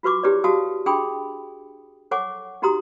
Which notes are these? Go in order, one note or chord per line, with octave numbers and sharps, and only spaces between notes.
F4 F#4 B4 C#6 D6
E4 G4 G#4 B4 C#5 D5
F#4 G4 F5 A5 D#6
D4 G#4 G5 B5 C6 D#6
A4 C#5 F#5 G#5 C#6 D6
D#4 F#4 G4 A#5 C6 D#6